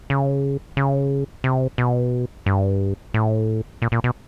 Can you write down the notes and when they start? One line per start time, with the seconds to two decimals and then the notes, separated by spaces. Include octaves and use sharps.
0.10 C#3
0.77 C#3
1.44 C3
1.78 B2
2.46 G2
3.14 A2
3.82 A#2
3.92 A#2
4.04 B2